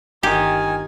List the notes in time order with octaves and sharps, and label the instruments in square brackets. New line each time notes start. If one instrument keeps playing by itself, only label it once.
[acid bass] G1 [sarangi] D#3 [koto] G4 [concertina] G#5